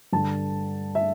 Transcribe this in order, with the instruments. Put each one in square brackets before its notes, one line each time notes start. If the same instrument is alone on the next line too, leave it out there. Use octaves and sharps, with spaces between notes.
[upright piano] G2 D3 A5
E5